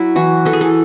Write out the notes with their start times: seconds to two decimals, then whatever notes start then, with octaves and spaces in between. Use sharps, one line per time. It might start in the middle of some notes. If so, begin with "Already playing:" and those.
Already playing: F#3 E4
0.16 E3 F#4
0.45 E3 A4
0.53 G#4
0.61 A4